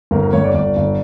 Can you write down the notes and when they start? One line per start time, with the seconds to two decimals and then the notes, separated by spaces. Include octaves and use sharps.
0.11 G1 A#4
0.23 A#4
0.33 G1 C#5
0.44 D5
0.54 G1 D5
0.77 G1